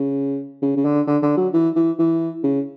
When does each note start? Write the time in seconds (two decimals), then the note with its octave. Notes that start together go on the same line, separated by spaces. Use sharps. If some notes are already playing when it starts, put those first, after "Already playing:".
Already playing: C#3
0.62 C#3
0.77 C#3
0.85 D3
1.07 D3
1.23 D3
1.37 F#3
1.54 E3
1.76 E3
1.99 E3
2.44 C#3